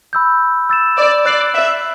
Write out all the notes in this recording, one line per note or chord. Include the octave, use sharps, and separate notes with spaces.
B5 E6 G6
E6 A6 E7
D5
D5 F#6 C7 F#7
E5